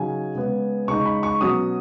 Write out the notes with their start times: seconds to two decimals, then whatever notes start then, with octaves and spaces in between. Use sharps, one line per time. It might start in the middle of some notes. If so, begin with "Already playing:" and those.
Already playing: C#3 F#3 D#4 G#5
0.35 C#3 G#3 B3
0.88 C#3 G#3 D#4 C#6
1.06 B5
1.23 C#6
1.41 B2 F#3 C#4 D#6